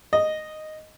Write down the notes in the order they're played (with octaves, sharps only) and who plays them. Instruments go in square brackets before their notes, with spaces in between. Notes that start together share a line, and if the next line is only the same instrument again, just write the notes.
[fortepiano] D#5